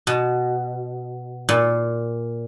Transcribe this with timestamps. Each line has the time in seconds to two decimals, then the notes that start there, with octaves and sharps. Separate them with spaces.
0.07 B2
1.49 A#2